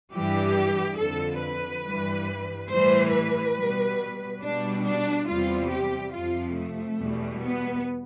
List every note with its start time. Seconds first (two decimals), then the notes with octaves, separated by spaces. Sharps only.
0.12 G2 E3 G3 G4
0.97 F2 D3 F3 A4
1.41 B4
1.83 G2 E3 G3
2.70 A2 E3 G3 C5
3.12 B4
3.56 B2 G3
4.41 B2 G3 D4
4.84 D4
5.27 E2 C3 G3 F4
5.70 G4
6.13 F2 C3 F3 F4
6.56 A3
6.99 E2 B2 G3
7.42 B3